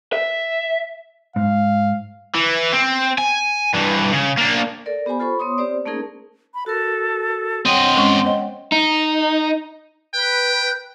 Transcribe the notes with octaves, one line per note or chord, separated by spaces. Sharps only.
E5
G#2 F5
E3
C4
G#5
G2 E3
C#3
A#3 D4
A4 A#4 D5
B3 G4 C5 G#5 B5
F4 A4 C5 B5 C#6
B3 C#5 C6 D#6
C4 G4 C5 D5
A3 A#3 C#4 D#4 G#4 A#4
B5
F#4 A4 A#4
C4 C#5 D#5 F#5 G5 C6
G#3 C#4 C#6
C5 D#5
D#4
B4 G5 F#6